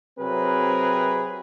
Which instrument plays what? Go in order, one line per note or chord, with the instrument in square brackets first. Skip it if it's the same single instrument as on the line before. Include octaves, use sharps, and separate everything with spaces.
[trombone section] C3 F#3 C4 G#4 A#4 B4